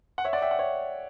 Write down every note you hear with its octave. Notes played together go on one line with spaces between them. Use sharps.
F#5
C#5 E5
D5 F#5
E5 G5
D5 F#5
C#5 E5